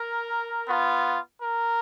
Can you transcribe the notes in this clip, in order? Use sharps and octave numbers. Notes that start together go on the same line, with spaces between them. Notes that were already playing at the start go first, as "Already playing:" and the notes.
Already playing: A#4
B3 F4
A#4